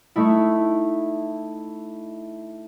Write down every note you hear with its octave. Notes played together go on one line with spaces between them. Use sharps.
A3 D#4 E4